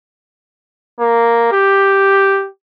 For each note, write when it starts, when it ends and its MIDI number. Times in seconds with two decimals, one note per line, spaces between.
1.00 1.52 58
1.53 2.48 67